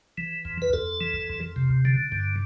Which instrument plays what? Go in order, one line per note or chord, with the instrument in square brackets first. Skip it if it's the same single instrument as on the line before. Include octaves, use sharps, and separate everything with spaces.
[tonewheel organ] E3
F2
B4
F2 A4
E3
F2
C3
D3
G2